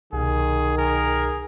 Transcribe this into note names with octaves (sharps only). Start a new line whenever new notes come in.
C2 B2 D#3 G#4
G#4 A#4